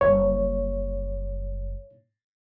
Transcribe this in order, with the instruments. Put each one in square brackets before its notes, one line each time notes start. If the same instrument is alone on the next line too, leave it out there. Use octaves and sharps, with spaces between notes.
[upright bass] F#1 G3 [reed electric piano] C#5